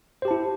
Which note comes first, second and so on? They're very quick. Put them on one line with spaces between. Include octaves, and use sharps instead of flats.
C5 G4 A5 E4